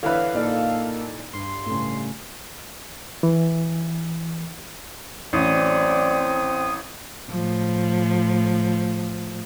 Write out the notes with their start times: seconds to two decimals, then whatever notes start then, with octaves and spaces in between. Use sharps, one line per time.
0.03 D3 E3 B4 C#5 E5 F5
0.34 A#2 A#3 D#4 A4 D5
1.34 G2 C6
1.66 A2 C#3
3.23 E3
5.33 A1 F#3 C4 D5 D#6
7.30 A2 F3